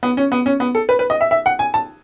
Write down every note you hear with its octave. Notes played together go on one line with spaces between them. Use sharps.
B3
C#4
B3
C#4
B3
A4
B4
B4
D#5
E5
E5
F#5
G#5
A5